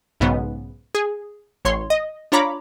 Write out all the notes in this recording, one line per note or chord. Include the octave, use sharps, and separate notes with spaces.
B1 G#2 C#3 B3
G#4
A1 C#5 C6
D#5
D4 F4 C#5 A#5 B5 D6